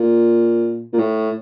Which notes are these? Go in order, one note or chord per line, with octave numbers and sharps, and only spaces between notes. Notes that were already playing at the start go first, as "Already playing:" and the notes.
Already playing: A#2
A#2
A2